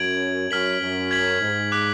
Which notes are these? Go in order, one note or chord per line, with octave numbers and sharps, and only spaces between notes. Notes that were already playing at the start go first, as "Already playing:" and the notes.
Already playing: F#2 G#6 D7 F#7
F#2 F6 B6 F#7
F#2
G#6 B6 F#7
G#2
D6 F#6 B6